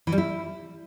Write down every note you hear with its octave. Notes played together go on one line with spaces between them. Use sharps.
E3
G3
E4